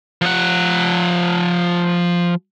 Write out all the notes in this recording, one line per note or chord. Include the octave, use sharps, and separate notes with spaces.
F3 F#5